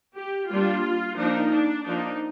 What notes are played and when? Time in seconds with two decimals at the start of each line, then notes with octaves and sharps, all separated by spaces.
0.16 G4
0.50 G3 A#3 D4 F4
1.17 F3 A#3 D4 D#4
1.51 D4
1.85 F3 A#3 D4 D#4